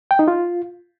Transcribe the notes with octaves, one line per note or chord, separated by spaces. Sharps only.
G5
D#4
F4